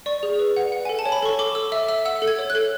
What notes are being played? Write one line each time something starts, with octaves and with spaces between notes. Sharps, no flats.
D5 C#6
G#4
B4
F#5
F#5
A4 G#5
A5
C#5
B5
A4 C#6
A4 D6
A4 E6
E5 E6
E5 E6
F#5 E6
A4
G#6
C#5
F#6
A4